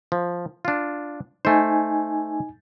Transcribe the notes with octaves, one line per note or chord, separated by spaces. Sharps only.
F3
D4 F4
A3 D#4 C5 G#5